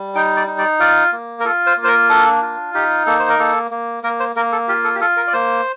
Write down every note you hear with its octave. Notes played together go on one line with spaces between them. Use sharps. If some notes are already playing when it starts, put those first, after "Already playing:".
Already playing: G3
D#4 G5
D5
D#4
D5
F4 D5
A#3
A#4
F4 A4
C5
A#3
C5
A#4
D4 A4
F4
D#4 G4
A#3 A4
C5
A#4
A#3 A4
A#3
A#3 A#4
C5
A#3 A#4
A4
F4 G4
A4
G4
F4 A4
A#4
D5
A#3 C5